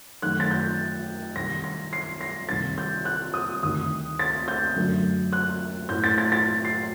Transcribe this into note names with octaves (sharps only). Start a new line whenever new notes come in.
F#2 D#3 A3 F#6
A6
G6
C2 C3 D#3 A#6
A#6
C7
A#6
C2 C3 D#3 A6
G6
F#6
D#6
D2 C3 D#3 D#6
A6
G6
F#2 D3 F#3 A3
F#6
A2 A3 G6
A6
A6
A6
C7